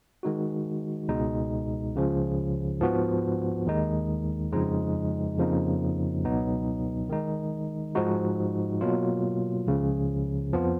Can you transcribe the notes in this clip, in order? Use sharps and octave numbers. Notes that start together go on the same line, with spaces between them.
D#3 G#3 D#4 F#4
C#2 B2 G#3 D#4
C#2 C#3 F3
G#2 F3 B3 F#4
D#2 D#3 G#3 D#4
F2 C#3 F3 G#3 D#4
F2 C#3 F3 A#3 D#4
C#2 B2 F#3 B3 D#4
D#3 G#3 D#4
G#2 F3 G#3 D#4 F#4
B2 F#3 A#3 F4
C#2 C#3 F3
F2 F3 B3 F4